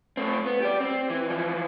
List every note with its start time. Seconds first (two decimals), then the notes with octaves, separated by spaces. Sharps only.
0.17 A3 C4
0.46 B3
0.62 G4 D5
0.80 C4
1.10 E3
1.29 E3 F3